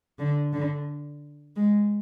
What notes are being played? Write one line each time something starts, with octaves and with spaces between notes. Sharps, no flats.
D3
D3
G#3